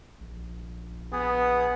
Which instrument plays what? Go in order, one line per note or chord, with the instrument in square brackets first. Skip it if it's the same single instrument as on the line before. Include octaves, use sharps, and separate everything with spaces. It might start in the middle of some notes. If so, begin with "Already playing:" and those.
[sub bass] A#1
[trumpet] B3 [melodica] G#4